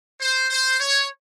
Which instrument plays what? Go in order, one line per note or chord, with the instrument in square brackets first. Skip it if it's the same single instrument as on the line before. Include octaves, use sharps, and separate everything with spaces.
[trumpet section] C5
C5
C#5